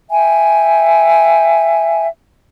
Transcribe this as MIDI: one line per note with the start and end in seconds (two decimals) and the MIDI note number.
0.10 2.07 76
0.10 2.07 79
0.10 2.07 80